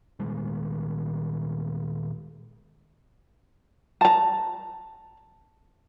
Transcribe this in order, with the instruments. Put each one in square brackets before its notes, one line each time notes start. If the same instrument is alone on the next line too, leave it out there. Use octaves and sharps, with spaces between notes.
[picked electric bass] A#2 D#3 G3 G#3
[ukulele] A5 A#5